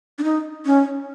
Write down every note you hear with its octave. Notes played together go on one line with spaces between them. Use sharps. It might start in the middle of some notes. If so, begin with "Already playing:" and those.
D4
D#4
C#4